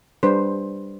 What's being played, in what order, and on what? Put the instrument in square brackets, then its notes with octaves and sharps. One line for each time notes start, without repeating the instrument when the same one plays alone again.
[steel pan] G3 D4 B4 C5